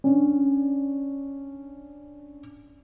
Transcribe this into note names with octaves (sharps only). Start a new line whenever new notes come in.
C#4 D4